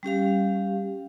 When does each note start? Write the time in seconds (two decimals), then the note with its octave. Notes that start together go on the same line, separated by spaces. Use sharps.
0.03 G3 C#4 G4 F5